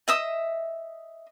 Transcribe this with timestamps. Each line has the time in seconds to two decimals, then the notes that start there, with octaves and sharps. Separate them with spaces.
0.08 D#5 E5 D#6